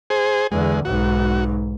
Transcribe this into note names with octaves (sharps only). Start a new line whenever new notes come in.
G#4 C5
E2 D3 G#3
B1 G#2 F#4